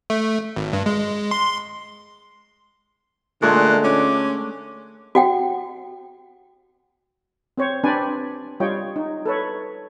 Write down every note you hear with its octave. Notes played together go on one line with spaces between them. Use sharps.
A3
G#1
G2
G#3
C6
A#2 D3 G#3 A3 G#5 F#6
C#4 D6
F#4 F#5 G5
C4 C5 C#5
C4 D4 B4 C5 D5 G#5
G3 F4 C#5 D#5 G5
D#4
A4 B4 C#5